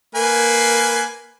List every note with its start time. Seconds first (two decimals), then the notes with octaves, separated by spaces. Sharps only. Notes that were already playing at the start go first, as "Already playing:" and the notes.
0.15 A#3 B4 G#5